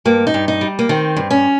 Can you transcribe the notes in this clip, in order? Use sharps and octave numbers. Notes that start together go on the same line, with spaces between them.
G2 A#3
D#4
G2
D#4
G3
A#3
D#3 C4
G2
C#4